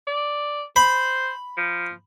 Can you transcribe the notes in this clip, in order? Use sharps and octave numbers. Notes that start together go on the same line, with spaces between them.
D5
C5 B5
F3